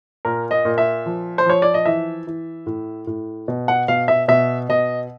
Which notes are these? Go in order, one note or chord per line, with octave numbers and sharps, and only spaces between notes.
A#2 A#4
D#5
A#2
E5
F3
C5
F3 C#5
D5
D#5
E3 E5
E3
A2
A2
B2
F#5
B2 F5
E5
B2 E5
B2 D#5